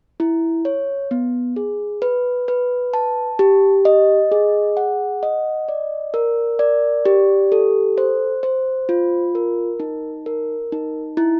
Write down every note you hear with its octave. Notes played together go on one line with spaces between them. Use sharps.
E4
C#5
B3
G#4
B4
B4
A5
G4
D#5
G#4
F#5
D#5
D5
A#4
D5
G4
A4
C5
C5
F4
A#4
D#4
A#4
D#4
E4